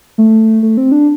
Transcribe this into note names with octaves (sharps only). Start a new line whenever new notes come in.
A3
A3
C4
D4